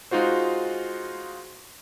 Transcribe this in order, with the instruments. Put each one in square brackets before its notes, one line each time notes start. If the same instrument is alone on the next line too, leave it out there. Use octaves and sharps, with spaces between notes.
[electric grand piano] G#3 D#4 F4 F#4 C5